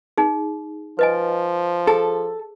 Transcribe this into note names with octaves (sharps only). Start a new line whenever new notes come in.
D#4 G#4
F3 B4 D#5 G#5
G#4 A4